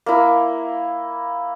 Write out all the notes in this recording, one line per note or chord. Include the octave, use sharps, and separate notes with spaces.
A#3 E4